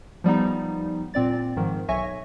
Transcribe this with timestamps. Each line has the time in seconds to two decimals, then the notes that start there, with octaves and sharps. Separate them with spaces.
0.24 F3 G3 B3 D#4
1.14 A#2 C4 D5 A6
1.57 G#2 D#3 F3
1.88 B1 C#5 E5 G#5 C#6 A#6